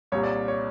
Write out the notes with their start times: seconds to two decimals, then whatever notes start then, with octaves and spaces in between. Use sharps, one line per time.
0.12 C2 A#2 G3 C#5
0.23 D5
0.48 C#5